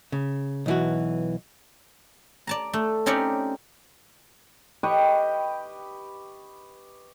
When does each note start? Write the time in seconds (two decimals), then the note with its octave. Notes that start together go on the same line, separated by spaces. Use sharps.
0.12 C#3
0.66 B1 E3 F#4
2.47 D5 A5 A#5
2.73 A3
3.06 C4 C#4 D#4 G4 C#5 D5
4.83 G4 B4 D#5 C#6